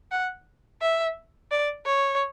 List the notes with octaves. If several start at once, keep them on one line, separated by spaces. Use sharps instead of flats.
F#5
E5
D5
C#5